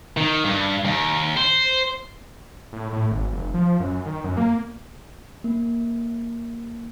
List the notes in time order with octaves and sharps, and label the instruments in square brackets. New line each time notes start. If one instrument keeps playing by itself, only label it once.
[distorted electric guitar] D#3
G2
D#2
C5
[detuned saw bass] A2
A2
G#1
F1
F3
F#2
D#3
F#2
A#3
[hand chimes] A#3